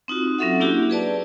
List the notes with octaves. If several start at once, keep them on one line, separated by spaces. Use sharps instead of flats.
C4 D#4 F4 F#4
F#3 C4 C#4 A4 E5 F#5
A#3 D4 E4 F#4 G4
G#4 B4 D5 A5